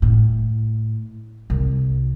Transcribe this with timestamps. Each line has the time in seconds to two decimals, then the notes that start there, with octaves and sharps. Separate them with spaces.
0.02 A2
1.50 C2